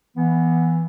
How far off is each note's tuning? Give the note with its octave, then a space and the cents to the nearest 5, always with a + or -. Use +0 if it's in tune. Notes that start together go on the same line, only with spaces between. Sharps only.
E3 +0 B3 -15